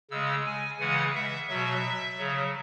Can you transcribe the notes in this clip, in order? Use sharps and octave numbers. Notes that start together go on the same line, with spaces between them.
C#3 G#3 E6
G#5
C#3 E3 G#3 F#5
E5
B2 F#3 E5
C#3 F#3